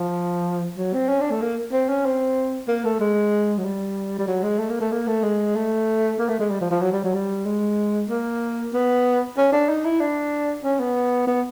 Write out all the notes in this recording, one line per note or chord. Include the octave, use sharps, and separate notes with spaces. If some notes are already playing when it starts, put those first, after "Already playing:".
Already playing: F3
F#3
C4
C#4
D4
A3
A#3
C4
C#4
C4
A#3
A3
G#3
F#3
G3
G3
F#3
G#3
A3
A#3
A3
A#3
A3
G#3
A3
A#3
A3
G#3
G3
F3
F3
F#3
G3
F#3
G3
G#3
A#3
B3
C#4
D4
D#4
E4
D4
C#4
B3
B3